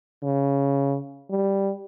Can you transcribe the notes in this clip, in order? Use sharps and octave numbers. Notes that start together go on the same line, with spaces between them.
C#3
G3